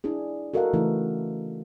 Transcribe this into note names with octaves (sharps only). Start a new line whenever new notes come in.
D4 E4 G#4
F#4 A4 A#4 D#5 F5 F#5
C#3 E3 A3 D#4 E4